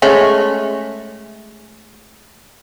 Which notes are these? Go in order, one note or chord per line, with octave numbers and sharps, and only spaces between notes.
G#3 A3 C#4